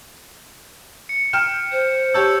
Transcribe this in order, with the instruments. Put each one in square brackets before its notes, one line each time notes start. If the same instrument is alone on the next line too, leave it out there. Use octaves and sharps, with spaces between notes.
[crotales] C#7
[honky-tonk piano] G5 F6 E7
[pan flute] C5
[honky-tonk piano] G4 C#5 A5 [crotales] E6 G6